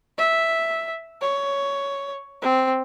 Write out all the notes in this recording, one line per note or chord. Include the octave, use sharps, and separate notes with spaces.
E5
C#5
C4